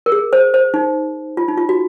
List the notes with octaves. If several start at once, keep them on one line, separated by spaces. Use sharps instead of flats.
A#4
G#4
C5
C5
D#4
F4
D#4
F4
F#4